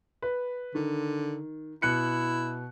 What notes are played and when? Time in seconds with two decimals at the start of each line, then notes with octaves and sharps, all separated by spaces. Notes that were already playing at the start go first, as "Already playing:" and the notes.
0.22 B4
0.75 D3 D#3
1.82 B2 E4 F#6 C#7